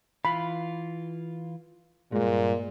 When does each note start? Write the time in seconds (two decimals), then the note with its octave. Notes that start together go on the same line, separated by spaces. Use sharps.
0.25 E3 F4 B5
2.12 G2 A#2 G#3